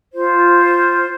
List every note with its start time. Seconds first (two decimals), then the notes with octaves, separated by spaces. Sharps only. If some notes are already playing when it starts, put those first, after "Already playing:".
0.13 F4 C5